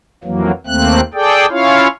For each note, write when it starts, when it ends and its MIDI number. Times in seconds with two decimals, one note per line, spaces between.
0.24 0.51 41
0.24 0.51 52
0.24 0.51 54
0.24 0.51 58
0.67 1.01 39
0.67 1.01 57
0.67 1.01 58
0.67 1.01 60
0.67 1.01 90
1.14 1.46 68
1.14 1.46 69
1.14 1.46 74
1.14 1.46 79
1.50 1.88 61
1.50 1.88 64
1.50 1.88 65
1.50 1.88 73
1.50 1.88 77